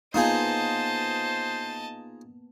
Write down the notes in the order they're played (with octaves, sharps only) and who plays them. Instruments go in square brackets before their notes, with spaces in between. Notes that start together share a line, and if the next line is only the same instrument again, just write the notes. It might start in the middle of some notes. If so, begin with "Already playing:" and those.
[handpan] A#3 B3 [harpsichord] D#4 F4 G#4 [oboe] C5 [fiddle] D#5 A5